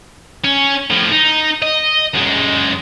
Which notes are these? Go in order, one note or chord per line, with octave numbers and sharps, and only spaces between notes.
C#4
A2 F3
D#4
D#5
F#2 G#3